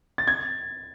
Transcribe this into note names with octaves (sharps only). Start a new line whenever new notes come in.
A6
G#6